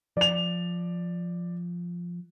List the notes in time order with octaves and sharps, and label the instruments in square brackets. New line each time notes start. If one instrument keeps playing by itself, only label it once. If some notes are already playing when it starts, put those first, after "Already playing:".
[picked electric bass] F3 [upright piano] D5 F7